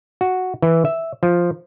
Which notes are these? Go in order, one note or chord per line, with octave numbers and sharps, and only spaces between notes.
F#4
E3
E5
F3